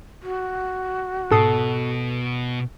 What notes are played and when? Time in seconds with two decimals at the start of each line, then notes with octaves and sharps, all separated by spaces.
0.23 F#4
1.31 G#2 B2 A4 D#6 C7